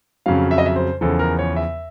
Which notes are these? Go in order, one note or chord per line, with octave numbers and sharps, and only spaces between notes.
F2 C#3 F#3 F5
E5
D#5
E5
C5
E2 C#3 F3 A4
A#4
C#5
E5